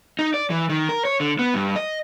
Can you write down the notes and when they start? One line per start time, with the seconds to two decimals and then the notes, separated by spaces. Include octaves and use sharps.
0.19 D#4
0.34 D5
0.50 E3
0.69 D#3
0.89 A#4
1.05 C#5
1.20 D3
1.39 B3
1.54 G2
1.76 D#5